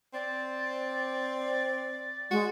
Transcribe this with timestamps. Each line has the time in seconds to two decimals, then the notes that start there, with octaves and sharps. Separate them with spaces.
0.14 C4 D5
2.31 G#3 F#4